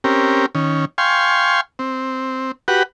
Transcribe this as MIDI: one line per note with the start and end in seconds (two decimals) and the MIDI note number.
0.04 0.46 60
0.04 0.46 61
0.04 0.46 67
0.04 0.46 70
0.55 0.85 51
0.55 0.85 61
0.98 1.61 77
0.98 1.61 79
0.98 1.61 80
0.98 1.61 84
0.98 1.61 85
1.79 2.52 60
2.68 2.83 66
2.68 2.83 67
2.68 2.83 71
2.68 2.83 78